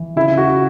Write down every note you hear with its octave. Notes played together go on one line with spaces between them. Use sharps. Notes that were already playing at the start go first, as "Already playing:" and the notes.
Already playing: E3
C#3 E4
F#4